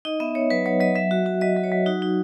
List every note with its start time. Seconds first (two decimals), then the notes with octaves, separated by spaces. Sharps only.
0.05 D#4 D#5
0.20 B3 E5
0.35 B3 C#5
0.50 F#3 B4
0.66 F#3 C#5
0.80 F#3 D#5
0.95 F#3 E5
1.11 F#4
1.26 F#4
1.41 F#3 D#5
1.56 F#3
1.64 C#5
1.71 F#3
1.86 D#4 F#4
2.02 D#4